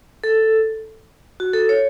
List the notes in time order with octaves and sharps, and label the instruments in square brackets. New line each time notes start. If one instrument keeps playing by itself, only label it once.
[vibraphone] A4
F#4
A4
C#5